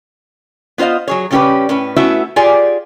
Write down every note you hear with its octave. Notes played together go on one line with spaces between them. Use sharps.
B3 F4 C5 D#5 F5
F#3 G#4 C#5
C#3 G3 C#4 F#4 G4 B4
A2 C#4 B4
A3 B3 C#4 E4 F#4 E5
F4 G4 G#4 D5 G#5